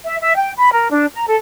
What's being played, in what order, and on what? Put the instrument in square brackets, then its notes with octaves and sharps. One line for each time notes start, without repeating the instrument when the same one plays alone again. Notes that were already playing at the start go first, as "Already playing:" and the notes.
[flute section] E5
E5
G5
B5
A#4
D4
A#5
A4